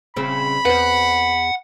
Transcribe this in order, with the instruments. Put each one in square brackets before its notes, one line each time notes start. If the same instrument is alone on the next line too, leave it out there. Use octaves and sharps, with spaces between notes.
[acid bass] D#1 [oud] C#3 C4 [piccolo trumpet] B5
[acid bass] E2 [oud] B4 C5 [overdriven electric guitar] F#5